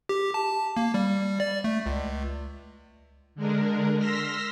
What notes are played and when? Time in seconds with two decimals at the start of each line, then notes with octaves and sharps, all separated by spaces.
0.09 G4
0.34 A5
0.77 A#3
0.94 G3
1.40 D5
1.64 A3
1.86 C#2
3.35 D3 G#3 D4 A#4
3.99 C6 E6 F6 A#6 B6